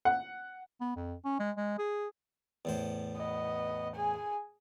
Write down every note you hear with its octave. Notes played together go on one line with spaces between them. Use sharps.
F#5
B3
F2
C#4
G#3
G#3
G#4
E2 A2 C5
B3 D#5
G#4 G#5